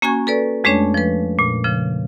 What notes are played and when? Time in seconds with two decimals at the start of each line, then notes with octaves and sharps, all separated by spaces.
0.02 A#3 C#4 F#4 G#5 C#6 G#6
0.27 A4 B4 D5
0.64 F2 G#3 A3 C#4 D4 C#5
0.94 F3 B4
1.39 A#2
1.64 C#3 F3